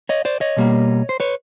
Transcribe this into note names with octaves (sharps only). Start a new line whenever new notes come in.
C#5 D#5
C5 D5
C#5 D#5
B2 G3 A#3
C5
B4 C#5